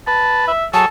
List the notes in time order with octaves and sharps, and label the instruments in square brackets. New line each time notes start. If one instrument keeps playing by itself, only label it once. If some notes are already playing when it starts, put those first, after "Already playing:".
[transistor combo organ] B4 [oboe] A5
[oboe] E5
[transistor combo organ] F#3 G#4 [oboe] A4 [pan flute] A5